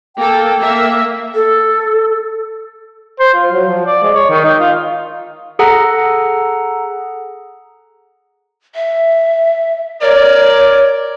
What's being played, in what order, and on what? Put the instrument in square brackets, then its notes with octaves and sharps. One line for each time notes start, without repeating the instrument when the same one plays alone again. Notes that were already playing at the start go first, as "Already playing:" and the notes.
[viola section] A#3 A4 [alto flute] G5
[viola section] A#3 E5
[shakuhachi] A4
[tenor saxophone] C5
F4
F#3
F3
D5
G#3
C#5
D#3
D#4
F4
[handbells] G#4 A4 F#5 A#5
[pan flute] E5
[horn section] A#4 D5 [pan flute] C#5